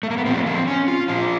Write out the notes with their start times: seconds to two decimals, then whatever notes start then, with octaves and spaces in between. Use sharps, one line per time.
0.03 A3
0.10 A#3
0.18 B3
0.26 A#2 F3 C4
0.46 C4
0.67 C#4
0.88 F4
1.08 A#2 F3 F4